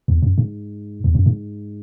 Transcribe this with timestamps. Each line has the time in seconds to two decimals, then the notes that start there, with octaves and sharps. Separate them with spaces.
0.08 E2
0.22 F#2
0.38 G#2
1.04 E2
1.15 F#2
1.26 G#2